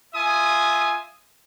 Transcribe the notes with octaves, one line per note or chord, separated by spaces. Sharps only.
F4 E5 G#5 D#6